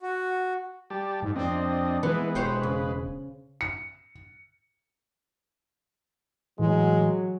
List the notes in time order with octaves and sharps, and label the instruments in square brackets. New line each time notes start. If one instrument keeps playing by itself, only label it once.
[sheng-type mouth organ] F#4
[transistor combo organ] G3 G4 A5
[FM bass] G#2
[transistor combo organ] F2 D4 D#5 [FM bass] C4
[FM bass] E3 [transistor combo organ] G#3 B4 [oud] B3
[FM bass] E1 [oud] G4 C5 C#5
[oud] C#3
[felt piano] C#7
[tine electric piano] A2 E3 [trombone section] F#3 [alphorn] G#3